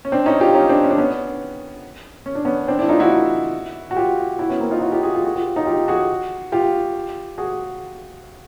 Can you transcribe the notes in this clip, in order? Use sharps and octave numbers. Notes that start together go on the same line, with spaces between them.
C#4
C4 D4
C#4 D#4
F4 G4
C#4 D#4
C4 D4
C#4
D4
B3 C#4
C#4
D4
B3 C#4
C4 D4
D4 E4
D#4 F4
E4 F#4
F#4
F4 G4
E4 F#4
B3 C#4
A#3 C4
D#4 F4
E4 F#4
F4 G4
F#4 G#4
F4 G4
F#4 G#4
F4 G4
D#4 F4
F4 G4
F#4 G#4
F4 G4
F#4 G#4